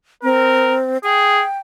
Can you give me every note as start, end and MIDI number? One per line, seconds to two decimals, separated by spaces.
0.23 0.98 60
0.23 0.76 70
1.04 1.45 68
1.04 1.58 79